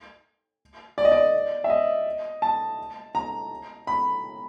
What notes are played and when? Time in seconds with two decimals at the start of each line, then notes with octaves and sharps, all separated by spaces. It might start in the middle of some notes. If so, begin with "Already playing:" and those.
0.98 D5
1.05 D#5
1.12 D5
1.64 E5
1.70 D#5
2.42 A5
3.15 A#5
3.87 B5